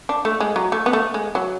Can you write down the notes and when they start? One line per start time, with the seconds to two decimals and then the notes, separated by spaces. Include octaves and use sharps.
0.09 D4
0.25 A3
0.40 G#3
0.56 F#3
0.72 A3
0.86 B3
0.93 A3
1.14 G#3
1.35 F#3